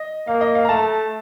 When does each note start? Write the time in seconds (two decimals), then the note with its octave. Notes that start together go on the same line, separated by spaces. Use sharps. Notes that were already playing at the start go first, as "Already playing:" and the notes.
Already playing: D#5
0.27 A#3 F5
0.41 D#5
0.55 F5
0.65 A#5
0.69 A3 A5